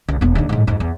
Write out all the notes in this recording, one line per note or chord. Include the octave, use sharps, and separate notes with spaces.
C#2
E1 B3
D#2 D3
A1 G#2
F2 G#2
E2